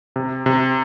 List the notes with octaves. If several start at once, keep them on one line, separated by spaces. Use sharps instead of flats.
C3
C3